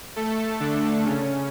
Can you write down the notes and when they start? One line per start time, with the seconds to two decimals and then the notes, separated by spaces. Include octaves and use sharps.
0.16 A3 A4
0.60 D3 D4
1.06 C#3 C#4